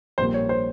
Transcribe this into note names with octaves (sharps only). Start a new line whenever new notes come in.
A#1 A#2 G3 A#3 C5
C#5
C5